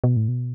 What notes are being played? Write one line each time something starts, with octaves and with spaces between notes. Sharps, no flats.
B2
A2
B2